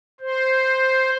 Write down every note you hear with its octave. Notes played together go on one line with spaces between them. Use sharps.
C5